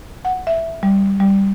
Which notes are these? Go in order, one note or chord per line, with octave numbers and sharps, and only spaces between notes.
F#5
E5
G3
G3